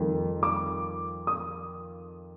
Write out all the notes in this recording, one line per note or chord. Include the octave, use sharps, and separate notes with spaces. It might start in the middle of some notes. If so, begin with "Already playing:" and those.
Already playing: F2 D#3 G3 A#3
D6
D#6